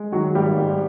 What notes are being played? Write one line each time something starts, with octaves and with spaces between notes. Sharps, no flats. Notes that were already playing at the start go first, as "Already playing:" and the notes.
Already playing: G#3
D#3 F#3 F#4
G#1 G3 G4
G#2